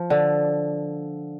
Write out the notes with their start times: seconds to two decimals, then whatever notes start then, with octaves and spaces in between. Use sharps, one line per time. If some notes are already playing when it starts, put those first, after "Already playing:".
Already playing: F3
0.10 D3